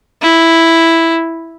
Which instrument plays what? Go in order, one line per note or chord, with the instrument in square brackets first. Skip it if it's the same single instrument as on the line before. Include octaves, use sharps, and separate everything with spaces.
[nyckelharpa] E4